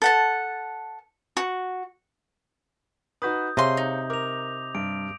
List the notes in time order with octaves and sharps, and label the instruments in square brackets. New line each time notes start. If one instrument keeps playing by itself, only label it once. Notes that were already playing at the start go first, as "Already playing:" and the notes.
[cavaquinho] A4 F#5 A5
F#4
[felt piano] D#4 F#4 B4 [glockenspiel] D#6 G6
[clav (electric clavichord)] C3 [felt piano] G#4 C#5 F5 [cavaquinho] D#5 C6
[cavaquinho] D#4
[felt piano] A#4 [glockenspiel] D6 A#6 F7
[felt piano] G2 [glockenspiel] D7